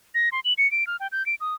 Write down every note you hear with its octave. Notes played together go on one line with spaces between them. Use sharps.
A#6
C6
F#7
C#7
D7
F6
G5
G6
D7
D#6